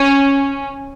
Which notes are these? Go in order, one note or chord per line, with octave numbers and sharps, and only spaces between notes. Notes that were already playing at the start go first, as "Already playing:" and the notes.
Already playing: C#4